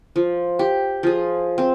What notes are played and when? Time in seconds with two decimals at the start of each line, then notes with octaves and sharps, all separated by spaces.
0.16 F3
0.59 G4
1.03 F3 G#4
1.58 C4